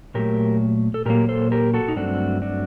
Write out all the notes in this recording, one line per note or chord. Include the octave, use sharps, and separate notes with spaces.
A#2 F#3 A3 G4 A#4
A4
A#2 F#3 A#3 G4 A#4
A4 C5
G4 A#4
F#4 A4
D#4
G2 F#3 A3 C4 D4 F#4
D4 F#4